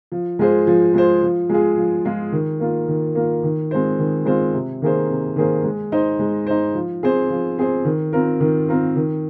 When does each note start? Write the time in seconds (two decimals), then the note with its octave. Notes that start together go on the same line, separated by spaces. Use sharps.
0.12 F3
0.39 G#3 F4 G#4 C5
0.67 F3
0.94 G#3 F4 G#4 C5
1.22 F3
1.49 G#3 F4 G#4
1.77 F3
2.05 G#3 F4 G#4
2.32 D#3
2.60 A#3 F4
2.88 D#3
3.15 A#3 F4
3.43 D#3
3.71 G#3 C4 F4 C5
3.99 D#3
4.25 G#3 C4 F4 C5
4.54 C3
4.82 D#3 A#3 G#4 C5
5.10 C3
5.36 D#3 A#3 G#4 C5
5.64 G#3
5.92 D#4 C5
6.19 G#3
6.47 D#4 C5
6.74 F3
7.03 C4 G#4 C5
7.30 F3
7.58 C4 G#4 C5
7.85 D#3
8.13 C4 F4 A#4
8.40 D#3
8.68 C4 F4 A#4
8.96 D#3